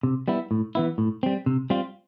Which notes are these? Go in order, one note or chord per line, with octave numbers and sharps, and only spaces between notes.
C3
G3 B3 E4
A2
E3 B3 E4
A2
G3 C4
C3
G3 C4 F4